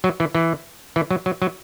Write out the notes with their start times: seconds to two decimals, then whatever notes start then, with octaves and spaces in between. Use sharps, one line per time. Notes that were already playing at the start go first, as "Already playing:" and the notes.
0.04 F#3
0.20 E3
0.35 E3
0.96 E3
1.11 F#3
1.26 F#3
1.42 F#3